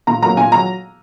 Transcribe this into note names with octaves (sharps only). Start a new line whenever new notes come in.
A#2 A#5
F#3 A#3 A#5
A#2 G#5
F#3 A#5